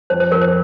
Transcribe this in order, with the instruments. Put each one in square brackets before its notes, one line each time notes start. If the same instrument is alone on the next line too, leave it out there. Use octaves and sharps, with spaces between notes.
[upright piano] F2 [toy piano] C5
[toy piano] C5
[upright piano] F2 [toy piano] A#4
[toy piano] C5